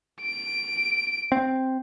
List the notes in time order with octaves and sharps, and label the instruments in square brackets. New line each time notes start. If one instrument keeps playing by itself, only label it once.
[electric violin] D7
[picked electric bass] C4